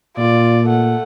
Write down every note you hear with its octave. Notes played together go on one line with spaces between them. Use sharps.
A#2 F4 D5
A3 F#5